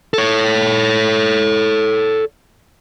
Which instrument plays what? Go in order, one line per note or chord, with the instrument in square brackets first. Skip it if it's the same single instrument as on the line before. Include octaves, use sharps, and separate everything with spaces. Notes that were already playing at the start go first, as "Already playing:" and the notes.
[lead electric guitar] A4 C#5